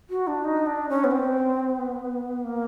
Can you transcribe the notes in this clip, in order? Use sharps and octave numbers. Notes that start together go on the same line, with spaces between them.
F#4
D4
D#4
D4
C#4
B3
C4
B3
A#3